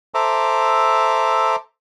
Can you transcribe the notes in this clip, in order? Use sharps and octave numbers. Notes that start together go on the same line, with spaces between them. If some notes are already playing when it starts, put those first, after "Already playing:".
A4 C5 E5 A#5 D6